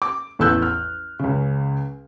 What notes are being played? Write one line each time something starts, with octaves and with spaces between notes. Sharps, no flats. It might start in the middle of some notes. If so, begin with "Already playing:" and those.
D6
A1 E2 A4 E6 F#6 G6
F6
C#2 C#3